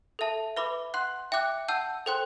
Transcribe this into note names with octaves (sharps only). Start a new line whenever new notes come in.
A4 E5 A5
B4 E5 B5 D6
F#5 C6 F#6
E5 G5 D6 F#6
F#5 A5 E6 G6
A4 C5 G5 C6 F#6